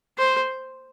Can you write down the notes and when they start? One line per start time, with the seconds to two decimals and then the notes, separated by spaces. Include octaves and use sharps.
0.18 C5